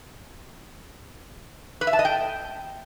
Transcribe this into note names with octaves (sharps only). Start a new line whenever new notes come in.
B4
E5
A5
D#5
G5